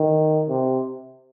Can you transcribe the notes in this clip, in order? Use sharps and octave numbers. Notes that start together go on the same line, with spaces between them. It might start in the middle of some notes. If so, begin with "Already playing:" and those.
Already playing: D#3
C3